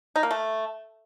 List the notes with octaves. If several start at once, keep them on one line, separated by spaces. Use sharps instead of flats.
D#4
A#3
A3